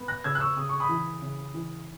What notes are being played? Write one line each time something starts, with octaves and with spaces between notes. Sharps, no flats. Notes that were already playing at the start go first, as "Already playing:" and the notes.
Already playing: B3
F#6 A#6
C#3 E6 G#6
F#6
C#6 E6
C#3 D#6
C#6
B5 D#6
E3
C#3
E3